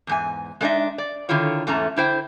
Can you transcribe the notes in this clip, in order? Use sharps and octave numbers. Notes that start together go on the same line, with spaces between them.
E2 G#2 G#5
G#3 A3 D4 D#4 D#5 E5
D5
D3 D#3 E4 F4 C#5
E2 G#2 A3 C#4 A5 A#5
D3 E4 C5 G5